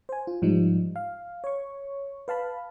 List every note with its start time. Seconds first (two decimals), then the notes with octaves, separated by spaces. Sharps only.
0.09 C5 G#5
0.27 F4
0.42 G#2 F3 G3 D#4
0.96 F5
1.44 C#5 C#6
2.28 B4 F5 A5 B5